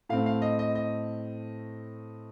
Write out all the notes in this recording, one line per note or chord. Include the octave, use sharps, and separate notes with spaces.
A2 A3 C4 F5
F5
D#5
D#5
D#5